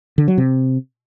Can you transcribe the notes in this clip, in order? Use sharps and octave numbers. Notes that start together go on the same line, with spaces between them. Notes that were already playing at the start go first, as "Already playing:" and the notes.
D3
F#3
C3